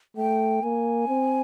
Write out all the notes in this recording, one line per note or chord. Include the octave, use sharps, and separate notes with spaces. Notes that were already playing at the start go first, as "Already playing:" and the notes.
A3 G5
A#3 G#5
C4